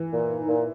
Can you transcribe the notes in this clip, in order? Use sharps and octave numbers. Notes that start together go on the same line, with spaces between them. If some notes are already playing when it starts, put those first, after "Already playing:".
Already playing: E3
A#2
D#4
A#2